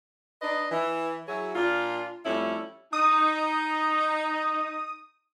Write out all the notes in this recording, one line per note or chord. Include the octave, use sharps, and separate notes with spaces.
D4 D#4 B4 D5 D#5
E3
F#3 E4 F#4 G#4 C#5
A#2 D4 F4
F2 G3 A3 C#4 E4
D#4 D#6